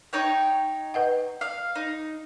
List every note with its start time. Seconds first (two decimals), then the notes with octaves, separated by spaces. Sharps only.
0.13 D#4 C#5 G5
0.94 B4 D#5 F#5
1.41 F5
1.76 D#4